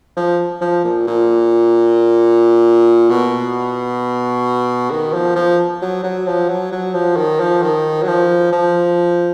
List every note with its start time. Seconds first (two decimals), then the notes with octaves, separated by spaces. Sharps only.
0.17 F3
0.61 F3
0.84 A#2
1.07 A#2
3.10 B2
4.91 D#3
5.14 F3
5.36 F3
5.82 F#3
6.04 F#3
6.27 F3
6.49 F#3
6.72 F#3
6.94 F3
7.17 D#3
7.40 F3
7.62 D#3
8.03 F#3
8.08 F3
8.53 F3